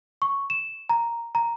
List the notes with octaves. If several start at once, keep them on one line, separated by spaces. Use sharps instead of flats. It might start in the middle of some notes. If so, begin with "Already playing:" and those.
C#6
E7
A#5
A#5